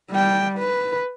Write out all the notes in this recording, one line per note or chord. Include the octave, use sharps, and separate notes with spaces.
G3 G5
B4